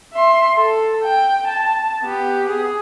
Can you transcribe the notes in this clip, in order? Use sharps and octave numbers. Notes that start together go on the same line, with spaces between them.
E5 C6
A4
G5
A5
B3 G4
G#4